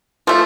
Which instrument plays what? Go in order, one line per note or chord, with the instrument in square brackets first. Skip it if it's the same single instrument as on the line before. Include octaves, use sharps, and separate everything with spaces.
[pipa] F3 A3